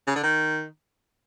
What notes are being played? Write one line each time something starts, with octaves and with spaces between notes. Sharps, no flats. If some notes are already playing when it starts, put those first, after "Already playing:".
C#3
D3
D#3